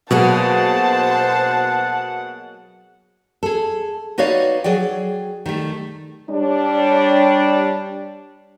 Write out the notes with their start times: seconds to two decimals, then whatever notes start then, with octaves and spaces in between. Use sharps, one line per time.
0.11 B2 F#3 A#3 G#4 C5 F#5 A5
3.43 G#4 A4
4.18 D#4 F#4 B4 C#5 D5 F5
4.64 F#3 G#4 D5 G5
5.46 D#3 G3 A3
6.30 G3 D4 C#5